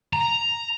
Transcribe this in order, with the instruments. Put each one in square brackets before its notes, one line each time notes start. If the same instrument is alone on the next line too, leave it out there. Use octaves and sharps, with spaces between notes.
[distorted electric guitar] A#5